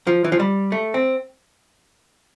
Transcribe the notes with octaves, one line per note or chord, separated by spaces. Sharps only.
F3
E3
F3
G3
A3
C4